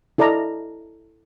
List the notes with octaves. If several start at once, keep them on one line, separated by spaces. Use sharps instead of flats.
E4 A4 D5 D#5 A#5